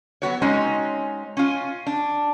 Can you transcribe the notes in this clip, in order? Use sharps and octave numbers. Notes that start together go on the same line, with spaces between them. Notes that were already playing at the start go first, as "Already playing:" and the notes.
F#3 B3 F#4 C#5
G#3 C4 C#4 D#4 F#4
C#4 F4
D4